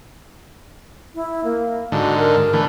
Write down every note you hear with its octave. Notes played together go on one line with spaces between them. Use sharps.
E4
A#3
G#2 D3 F#4
A#4
D3 E3 A3